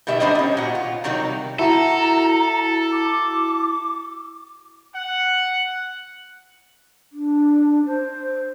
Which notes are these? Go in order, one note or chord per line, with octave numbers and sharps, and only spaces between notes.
B2 D#3 G3 E5
F#3 G3 B3 D4 C5 D#5
D#3 C#4
A#2 F#4
F4
C3 D#3 F#3 G3 D#4
E4 F#4 A4 A#5
D6
F#5
D4
C5